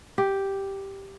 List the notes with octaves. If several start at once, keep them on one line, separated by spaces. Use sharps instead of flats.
G4